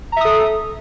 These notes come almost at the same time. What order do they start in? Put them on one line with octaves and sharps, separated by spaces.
A#5 E5 D#6 A4